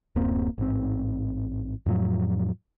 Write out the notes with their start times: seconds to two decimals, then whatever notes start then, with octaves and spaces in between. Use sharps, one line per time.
0.16 D1 F#2 A#3 C4
0.58 A1 G#2 C4
1.86 F2 A2 F3 F#3